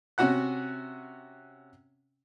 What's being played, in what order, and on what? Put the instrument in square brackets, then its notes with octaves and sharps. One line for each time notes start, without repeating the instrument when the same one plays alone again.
[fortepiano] C3 C#4 F#4 F#5 F#6